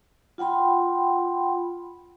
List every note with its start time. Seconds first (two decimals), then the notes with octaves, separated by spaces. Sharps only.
0.38 F4 F#5 G5 B5 C6